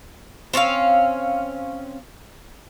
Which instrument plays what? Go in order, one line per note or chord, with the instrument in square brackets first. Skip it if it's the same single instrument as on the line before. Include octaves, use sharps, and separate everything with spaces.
[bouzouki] C4 C#4 C#5 F5